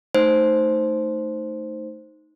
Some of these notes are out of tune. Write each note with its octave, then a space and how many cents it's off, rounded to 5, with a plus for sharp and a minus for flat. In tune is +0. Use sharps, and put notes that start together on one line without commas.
A3 +0 D#4 +0 C5 +0